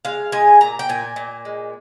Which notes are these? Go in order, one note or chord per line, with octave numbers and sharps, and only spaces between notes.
G#3 F5
G#3 G#5
A#2 A#5
G5
A#2 G#5
A#2
G#3